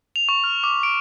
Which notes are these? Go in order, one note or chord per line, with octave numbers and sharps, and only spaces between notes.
F7
C#6
F6
D6
D7